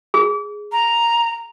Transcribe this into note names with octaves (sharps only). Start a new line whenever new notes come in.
G#4
A#5